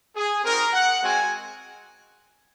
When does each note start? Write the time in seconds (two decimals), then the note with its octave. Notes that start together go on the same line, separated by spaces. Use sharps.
0.16 G#4
0.44 C4 D#4 F#4 A#4
0.73 F#5
1.02 G#3 C4 F#4 G#5